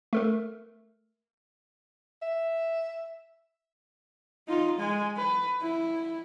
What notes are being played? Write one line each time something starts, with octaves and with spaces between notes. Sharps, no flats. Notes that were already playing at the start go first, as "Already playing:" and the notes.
A3 A4 A#4
E5
D#4 F4
G#3 G#5
B4
E4